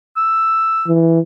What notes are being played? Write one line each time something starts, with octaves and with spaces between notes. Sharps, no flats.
E6
E3